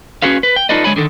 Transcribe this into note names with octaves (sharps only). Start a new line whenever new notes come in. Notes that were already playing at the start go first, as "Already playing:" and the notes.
C#4 F#4 G#4 B4 F5
B4
G5
D#4 F4 A4 B4 D5 D#5
D3 G#3 C#5 G#5 B5
D3 D#3 A4